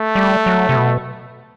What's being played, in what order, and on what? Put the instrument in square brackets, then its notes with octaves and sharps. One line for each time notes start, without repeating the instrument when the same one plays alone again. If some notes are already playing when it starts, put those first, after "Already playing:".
Already playing: [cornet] A3
[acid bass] G3
F#3
C3
B2